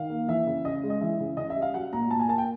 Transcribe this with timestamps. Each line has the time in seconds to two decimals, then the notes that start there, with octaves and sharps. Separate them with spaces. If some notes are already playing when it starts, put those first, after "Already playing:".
Already playing: D#3 F5
0.10 A#3
0.28 E3 E5
0.47 C#3
0.65 C#3 D#5
0.83 G#3
0.90 D#5
1.01 E3 E5
1.20 C#3
1.37 C#3 D#5
1.50 E5
1.56 G3
1.62 F5
1.74 F#3 F#5
1.92 A#2 A#5
2.11 A#2 A5
2.19 G#5
2.28 A#3 A5
2.38 G5